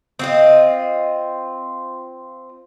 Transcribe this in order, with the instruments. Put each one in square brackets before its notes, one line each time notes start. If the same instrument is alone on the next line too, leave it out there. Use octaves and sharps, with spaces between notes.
[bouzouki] C4 F4 D#5